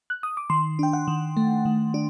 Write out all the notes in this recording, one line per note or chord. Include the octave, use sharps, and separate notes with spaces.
F#6
D#6
D6
D#3 C6
D4 G5
F#5
D#3
A3
D#3
D4